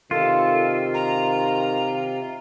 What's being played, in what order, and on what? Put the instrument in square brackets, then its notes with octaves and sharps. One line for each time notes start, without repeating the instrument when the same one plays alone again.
[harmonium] C3 [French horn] D#3 [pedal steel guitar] F4 [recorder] A4
[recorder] A#5